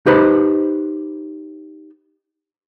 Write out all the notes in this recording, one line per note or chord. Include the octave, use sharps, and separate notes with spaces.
D#4 G4 B4 C5 A5 B5